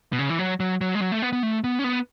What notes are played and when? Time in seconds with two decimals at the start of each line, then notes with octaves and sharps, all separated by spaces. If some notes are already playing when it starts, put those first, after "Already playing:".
0.13 B2
0.19 C#3
0.30 E3
0.39 F#3
0.60 F#3
0.81 F#3
0.95 G#3
1.01 F#3
1.12 A3
1.22 B3
1.33 B3
1.43 A3
1.64 B3
1.79 C#4
1.84 B3